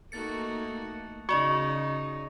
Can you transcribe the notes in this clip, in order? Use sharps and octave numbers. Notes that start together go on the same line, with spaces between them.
A3 A#3 D#4 F#4 A6 C#7
C#3 D#4 F#4 D5 D#5 C#6